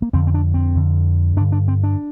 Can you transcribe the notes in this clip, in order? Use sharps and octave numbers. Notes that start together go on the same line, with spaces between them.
A#3
F2 D3 C4
C4
D4
C4
F2 D3
G2 D3 D4
D4
C4
D4